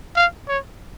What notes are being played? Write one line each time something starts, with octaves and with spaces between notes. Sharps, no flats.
F5
C#5